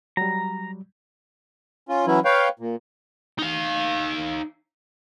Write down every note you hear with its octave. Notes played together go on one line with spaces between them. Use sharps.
F#3 G3 A#5
C#4 F4
E3 F#3 C#4 E4
B4 C#5 F5 G5
A#2
D#4 F5